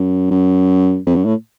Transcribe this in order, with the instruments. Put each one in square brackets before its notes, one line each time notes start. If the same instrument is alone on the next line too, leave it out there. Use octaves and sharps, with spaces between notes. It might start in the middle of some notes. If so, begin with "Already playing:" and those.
Already playing: [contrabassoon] F#2
F#2
F2
F#2
A2